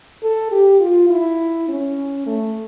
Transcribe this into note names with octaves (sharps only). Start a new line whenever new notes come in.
A4
G4
F4
E4
C#4
A3